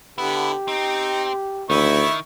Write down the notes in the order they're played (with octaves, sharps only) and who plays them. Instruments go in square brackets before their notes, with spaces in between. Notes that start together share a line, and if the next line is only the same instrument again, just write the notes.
[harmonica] D3 B3 [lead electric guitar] E4 [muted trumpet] G4
[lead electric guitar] C4 [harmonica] D#4
[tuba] D2 [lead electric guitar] D#3 [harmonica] E4 E5 C#6